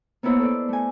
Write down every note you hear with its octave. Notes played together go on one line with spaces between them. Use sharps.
A#3 B3 D#4 E4 C5 C#5
A4 C5 D5
A3 G#5